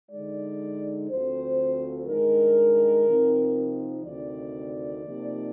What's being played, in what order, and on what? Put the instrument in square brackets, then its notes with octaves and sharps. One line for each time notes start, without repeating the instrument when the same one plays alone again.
[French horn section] D3 G#3 D#4 D5
D2 D3 F3 C4 C5
G2 D#3 G#3 D#4 A#4
C3 F3 C4 D#4
D2 C3 D#3 D5
C3 F3 A#3 D#4